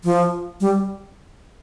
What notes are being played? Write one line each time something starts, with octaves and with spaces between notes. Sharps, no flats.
F3
G3